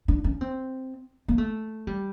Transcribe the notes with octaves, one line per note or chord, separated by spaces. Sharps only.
D4
C#4
C4
A#3
A3
G3